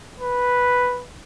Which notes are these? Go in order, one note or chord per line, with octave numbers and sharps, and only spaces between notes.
B4